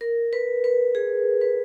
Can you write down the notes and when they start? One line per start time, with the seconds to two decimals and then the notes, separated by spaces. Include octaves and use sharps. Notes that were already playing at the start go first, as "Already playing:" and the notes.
0.01 A#4
0.33 B4
0.64 B4
0.95 G#4
1.41 B4